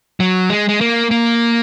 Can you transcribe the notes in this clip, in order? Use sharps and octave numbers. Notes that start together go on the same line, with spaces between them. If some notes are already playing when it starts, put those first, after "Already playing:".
F#3
G#3
G#3
A#3
A#3